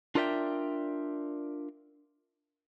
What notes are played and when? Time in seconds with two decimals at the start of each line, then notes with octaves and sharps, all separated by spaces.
0.15 D4 F4 A#4 D5 E5 G5